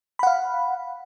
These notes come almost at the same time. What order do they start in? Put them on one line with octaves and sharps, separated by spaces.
B5 F#5 F5